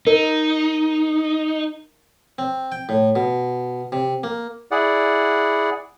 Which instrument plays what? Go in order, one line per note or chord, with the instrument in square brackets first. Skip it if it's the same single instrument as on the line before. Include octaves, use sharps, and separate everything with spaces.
[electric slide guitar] D#4 [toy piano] A#4
[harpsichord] C4
G5
A2
B2
C3
A#3
[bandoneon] E4 G#4 D5 F#5